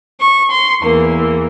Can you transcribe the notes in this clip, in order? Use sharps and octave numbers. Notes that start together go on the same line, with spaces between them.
C#6
C6
E2 E3 A#3